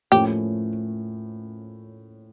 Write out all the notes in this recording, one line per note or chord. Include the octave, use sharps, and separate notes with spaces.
A2 F3 A#3 C#4 G4